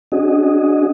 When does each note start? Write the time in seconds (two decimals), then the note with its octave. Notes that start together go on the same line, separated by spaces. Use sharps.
0.12 C#4 D4 F#4 G#4 D#5